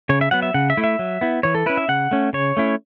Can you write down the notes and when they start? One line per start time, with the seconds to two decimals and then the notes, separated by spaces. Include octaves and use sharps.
0.09 C#3 C#5
0.21 E5
0.31 F#3 B3 F#5
0.42 E5
0.54 C#3 F#5
0.70 E5
0.77 A3 E4
0.84 E5
0.99 F#3
1.21 B3 E4
1.43 E3 C#5
1.55 A4
1.66 C#4 E4 B4
1.77 E5
1.88 C#3 F#5
2.11 A3 C#4
2.33 C#3 C#5
2.57 A3 C#4 E4